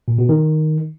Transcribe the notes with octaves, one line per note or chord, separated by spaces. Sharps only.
A#2
B2
D#3